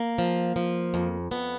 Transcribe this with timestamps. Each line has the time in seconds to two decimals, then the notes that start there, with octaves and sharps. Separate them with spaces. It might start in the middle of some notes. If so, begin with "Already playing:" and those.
Already playing: A#3
0.18 F3
0.56 F3
0.94 F2
1.31 F2 B3